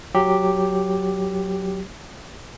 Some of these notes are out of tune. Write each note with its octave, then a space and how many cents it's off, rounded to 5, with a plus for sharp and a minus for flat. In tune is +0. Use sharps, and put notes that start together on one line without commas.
F#3 +0 G4 +0